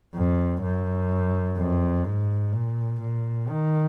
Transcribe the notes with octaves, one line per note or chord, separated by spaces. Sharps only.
F2
F#2
F2
G#2
A#2
A#2
D#3